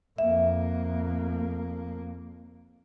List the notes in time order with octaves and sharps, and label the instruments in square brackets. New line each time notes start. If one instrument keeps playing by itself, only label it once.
[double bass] F2 A#3 [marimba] E5